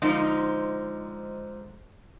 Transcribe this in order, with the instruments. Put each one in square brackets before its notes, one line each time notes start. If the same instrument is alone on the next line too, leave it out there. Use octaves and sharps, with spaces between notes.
[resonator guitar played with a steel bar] G#2 D3 F3 D#4